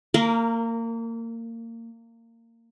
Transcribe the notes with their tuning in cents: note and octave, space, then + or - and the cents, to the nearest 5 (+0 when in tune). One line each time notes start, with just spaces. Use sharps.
A#3 -25 A#4 +0